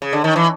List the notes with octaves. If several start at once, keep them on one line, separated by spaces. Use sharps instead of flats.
C#3
D3
D#3
E3